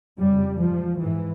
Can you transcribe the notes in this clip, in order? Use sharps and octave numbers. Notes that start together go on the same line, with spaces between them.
F2 C#3 G3
G#2 F3
G#2 E3